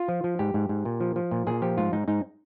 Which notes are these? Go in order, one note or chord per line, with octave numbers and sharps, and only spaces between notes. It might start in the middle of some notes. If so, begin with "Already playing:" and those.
Already playing: F4
F3
F3
G#2 G4
G#2
G#2
A#2
F3
F3
A#2
A#2 G#4
F3 G4
G#2 F4
G#2 D#4
G#2 D#4